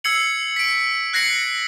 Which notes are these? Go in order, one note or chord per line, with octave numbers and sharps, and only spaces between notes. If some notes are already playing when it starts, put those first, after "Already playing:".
E6 G#6 C7 C#7 F#7
B6 D7
F#6 G#6 A#6 C7 C#7 F#7